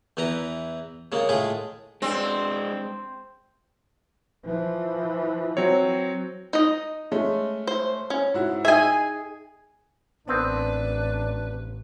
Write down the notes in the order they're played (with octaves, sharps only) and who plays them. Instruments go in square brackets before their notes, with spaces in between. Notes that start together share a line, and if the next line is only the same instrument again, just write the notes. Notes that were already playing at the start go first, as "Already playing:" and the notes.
[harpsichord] E2 E3 B4 A#5
C#3 G#3 A#3
A2 G#3 F4 G#4
[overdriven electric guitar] G#3 D4 [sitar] C4
[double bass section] E3 F3
[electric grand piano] F#3 C4 C#5
[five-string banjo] D#4 D#5
[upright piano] G#3 A3 C#4
[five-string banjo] C5
C#4
[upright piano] G#2 E4 F#4
[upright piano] D#4 [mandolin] G#4 G#5 [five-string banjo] D#5 E5
[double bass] A1 [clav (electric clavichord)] B3 C4 A#4 [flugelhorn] D4 [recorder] B4